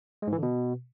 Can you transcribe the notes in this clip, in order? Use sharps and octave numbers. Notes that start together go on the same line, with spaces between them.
G#3
G#2
E3
D3
B2